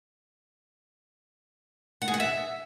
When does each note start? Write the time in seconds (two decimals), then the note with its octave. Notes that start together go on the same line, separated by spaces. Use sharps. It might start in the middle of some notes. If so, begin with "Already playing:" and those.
2.02 F#5
2.08 G#4
2.14 F#5
2.20 E5